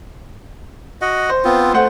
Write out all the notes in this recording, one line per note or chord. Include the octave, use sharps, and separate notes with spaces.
F#4 D#5 F#5
C5
B3 C4 F4
A3 C5 F#5